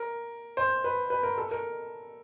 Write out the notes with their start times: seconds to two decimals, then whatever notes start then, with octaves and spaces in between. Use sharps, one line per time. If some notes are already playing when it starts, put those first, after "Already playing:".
Already playing: A#4
0.57 C5
0.84 B4
1.10 B4
1.23 A#4
1.38 A4
1.51 A#4